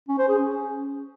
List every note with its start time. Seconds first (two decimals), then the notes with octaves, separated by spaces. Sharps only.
0.08 C#4
0.18 C5
0.29 G#4
0.39 C#4